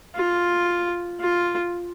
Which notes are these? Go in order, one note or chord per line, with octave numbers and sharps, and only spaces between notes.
F4
F4